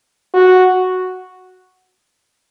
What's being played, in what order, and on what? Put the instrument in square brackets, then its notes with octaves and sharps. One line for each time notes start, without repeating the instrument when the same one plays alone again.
[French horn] F#4